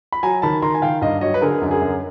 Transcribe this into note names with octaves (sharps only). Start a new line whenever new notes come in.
B5
F#3 G#5 A#5
D#3 A5 B5
D#3 A#5 C6
G#5
D#3 F5 G5
G2 D#5 F5
F#3 C#5 D#5
B4
D3 G#4 A#4
F#2
G#4 A#4
F#2